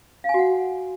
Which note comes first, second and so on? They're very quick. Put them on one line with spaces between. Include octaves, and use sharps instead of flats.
F5 G#5 F#4 F#5